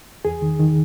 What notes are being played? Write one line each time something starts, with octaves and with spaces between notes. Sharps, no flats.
E2 G#4
D#3
D#3